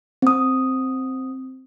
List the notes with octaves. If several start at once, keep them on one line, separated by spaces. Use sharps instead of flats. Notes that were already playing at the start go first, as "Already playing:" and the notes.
C4 D#6